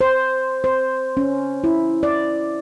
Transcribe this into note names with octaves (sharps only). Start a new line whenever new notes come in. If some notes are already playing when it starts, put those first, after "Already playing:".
C5
C5
C#4
E4
D5